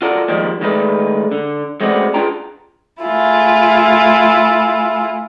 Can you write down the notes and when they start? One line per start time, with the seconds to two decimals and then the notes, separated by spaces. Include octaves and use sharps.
0.02 F4 F#4 A4 A#4 D5
0.28 D#3 F3 G3 G#3 A#3
0.61 D#3 G#3 A3 B4 D5
1.32 D3
1.80 G#3 A3 B3 C4 F#4 D5
2.14 D4 F4 G#4 B4 G5 A#5
3.02 A3 E4 F4 G#4